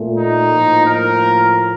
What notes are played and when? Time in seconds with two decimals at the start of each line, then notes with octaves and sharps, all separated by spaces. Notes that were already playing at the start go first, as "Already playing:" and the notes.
Already playing: A#2 A3
0.17 D#4
0.50 A2 F3 A#3
0.85 A#4